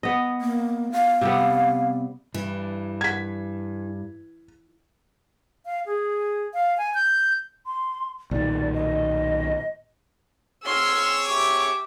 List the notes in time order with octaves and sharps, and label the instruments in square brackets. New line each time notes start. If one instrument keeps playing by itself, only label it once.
[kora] B3 D#5
[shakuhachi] A#3
F5
[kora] C3 G3 B3
[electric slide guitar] G2 [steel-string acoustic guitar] E3
[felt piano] G#6 B6
[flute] F5
G#4
F5
G#5
G6
[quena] C6
[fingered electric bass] B1 A#2 D#3 [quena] D5
[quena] D#5
[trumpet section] C4 G#4 C#5 [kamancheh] C6 [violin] E6 [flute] F6
[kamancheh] G4 E5 [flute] C#6 [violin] D6